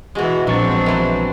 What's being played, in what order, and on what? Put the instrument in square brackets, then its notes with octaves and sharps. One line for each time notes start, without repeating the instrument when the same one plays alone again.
[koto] B2 G#3 [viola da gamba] E3 F#4
[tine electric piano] A#1 C#6 A6 [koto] F#3 [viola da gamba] G#3 C4 D4
[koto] E3 F#3